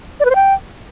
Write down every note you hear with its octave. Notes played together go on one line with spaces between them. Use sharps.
D5
B4
C5
G5